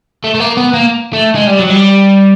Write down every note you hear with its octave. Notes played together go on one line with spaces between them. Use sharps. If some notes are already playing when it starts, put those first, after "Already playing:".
A3
A3
A#3
B3
A#3
A3
G#3
G3
F#3
G3